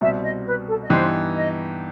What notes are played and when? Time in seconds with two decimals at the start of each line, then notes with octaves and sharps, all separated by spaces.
0.01 C2 B2 G3 C4 E5
0.24 D#5
0.46 B4
0.67 A4
0.83 D#5
0.90 G2 E3 B3 D#4 G4 C5
1.35 D#5